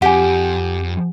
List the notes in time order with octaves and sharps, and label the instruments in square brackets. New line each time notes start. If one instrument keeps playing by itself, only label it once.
[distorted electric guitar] F2 [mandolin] G4 [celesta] F#5 G#5